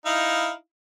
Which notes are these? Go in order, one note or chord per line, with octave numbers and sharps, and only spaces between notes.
D#4 E4 F5